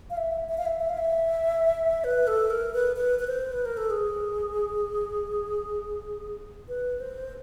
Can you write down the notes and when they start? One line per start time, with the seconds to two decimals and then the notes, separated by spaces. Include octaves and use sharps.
0.10 F5
0.17 E5
0.49 E5
0.58 F5
0.65 E5
0.80 E5
0.89 F5
0.97 E5
2.04 B4
2.27 A4
2.50 A#4
2.74 B4
2.96 B4
3.19 B4
3.27 C5
3.52 B4
3.65 A#4
3.77 A4
3.90 G#4
6.68 B4
7.00 C5